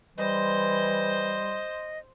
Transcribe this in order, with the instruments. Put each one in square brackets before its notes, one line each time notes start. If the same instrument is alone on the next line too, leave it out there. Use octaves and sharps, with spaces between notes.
[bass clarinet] E3 [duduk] G3 [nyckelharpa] C5 C6 [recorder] D#5